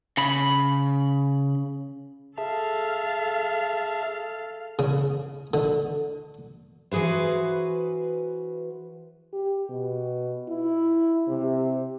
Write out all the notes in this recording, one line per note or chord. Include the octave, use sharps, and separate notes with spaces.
C#3 B5
G#4 A4 E5 F5 A5
C#3
D3
E3 F#4 G#4 B4 C5
G4
B2
E4
C3